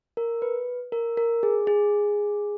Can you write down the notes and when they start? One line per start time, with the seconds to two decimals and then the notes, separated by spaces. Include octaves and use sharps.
0.17 A#4
0.42 B4
0.92 A#4
1.17 A#4
1.43 G#4
1.67 G#4